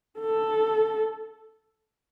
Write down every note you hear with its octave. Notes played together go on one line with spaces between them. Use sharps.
A4